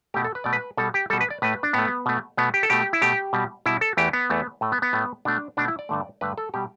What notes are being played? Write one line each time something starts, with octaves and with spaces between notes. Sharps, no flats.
B2 A3 G4
A4
B4
B2 A3 D5
B4
B2 G3 A4
G4
B2 G3 A4
B4
D5
A2 A3 B4
D4
A2 A3 B3
B2 A3
B2 A3 B3
G4
A4
B2 A3 G4
E4
B2 A3 G4
B2 G3
B2 G3 E4
A4
E2 E3 A3 G4
B3
E2 E3 A3
A2 A3
B3
B3
A2 A3
B2 A3 D4
B2 A3 D4
E4
D5
G2 D3 A3
G2 D3 A3 B4
A4
B2 G3 G4